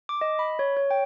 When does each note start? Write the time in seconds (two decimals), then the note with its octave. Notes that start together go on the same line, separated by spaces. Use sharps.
0.09 D6
0.21 D#5
0.39 B5
0.59 C#5
0.77 C#5
0.91 G5